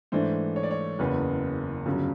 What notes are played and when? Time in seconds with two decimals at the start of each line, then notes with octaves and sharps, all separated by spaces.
0.12 G#2 E3 A3 D4 C5
0.56 C#5
0.63 D5
0.71 C#5
0.99 F#1 E2 C#3 B4
1.86 G1 F#2 C#3